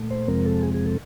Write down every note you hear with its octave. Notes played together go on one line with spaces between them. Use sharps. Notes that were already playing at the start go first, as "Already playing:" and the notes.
Already playing: A#2 A3
C5
F2 C3 F3 G#3 C4 A#4
A4
G#4
G#4
A4